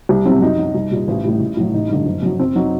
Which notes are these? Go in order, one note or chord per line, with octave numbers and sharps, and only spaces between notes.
C2 G4
C3 F#3 C4
F#2 D#4
F#3
C2
A#2 G3
A1
A2 G3
A1
A2 F#3
A1 D#4
G2 D3
F#1
F#2 F#3
F#1 C4
F#3 D#4